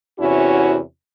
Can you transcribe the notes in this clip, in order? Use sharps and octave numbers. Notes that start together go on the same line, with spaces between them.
E2 C3 C#4 E4 F#4